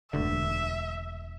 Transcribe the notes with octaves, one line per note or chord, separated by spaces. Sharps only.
E1 D2 G2 D3 E5